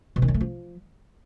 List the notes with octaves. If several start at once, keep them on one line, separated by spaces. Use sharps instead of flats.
B2
D#3
F#2
A3
F3